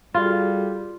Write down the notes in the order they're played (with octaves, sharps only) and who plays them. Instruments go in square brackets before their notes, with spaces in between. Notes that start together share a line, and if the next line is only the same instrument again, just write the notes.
[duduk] G3 [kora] F4 [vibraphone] F#4 G#4 A4